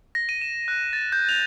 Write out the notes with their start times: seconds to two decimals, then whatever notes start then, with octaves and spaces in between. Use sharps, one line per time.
0.15 A#6
0.29 D#7
0.41 E7
0.68 F#6
0.93 A6
1.12 G6
1.29 F7